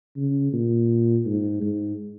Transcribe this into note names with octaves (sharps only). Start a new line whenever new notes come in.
C#3
A#2
G#2
G#2